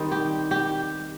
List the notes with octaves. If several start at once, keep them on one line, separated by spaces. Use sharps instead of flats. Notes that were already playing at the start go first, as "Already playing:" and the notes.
Already playing: D#3 G3 C4 D#4
G4
G4